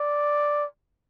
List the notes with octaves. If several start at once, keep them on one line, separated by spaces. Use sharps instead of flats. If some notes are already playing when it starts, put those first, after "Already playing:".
Already playing: D5